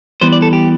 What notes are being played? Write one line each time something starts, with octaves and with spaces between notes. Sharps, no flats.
E3 G3 B3 C5
D5
A4
G4